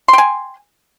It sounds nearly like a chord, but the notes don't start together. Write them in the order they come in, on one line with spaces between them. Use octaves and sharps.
C6 G5 G#5